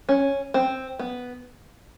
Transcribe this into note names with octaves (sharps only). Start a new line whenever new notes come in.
C#4
C4
B3